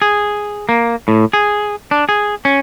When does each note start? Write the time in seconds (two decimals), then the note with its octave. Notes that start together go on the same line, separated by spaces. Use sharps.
0.02 G#4
0.69 A#3
1.08 A2
1.33 G#4
1.91 D4
2.09 G#4
2.45 C#4